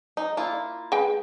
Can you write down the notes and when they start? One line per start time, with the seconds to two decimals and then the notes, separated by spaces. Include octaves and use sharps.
0.17 D#4
0.37 A#3 E4 F4
0.92 G#3 B4 G5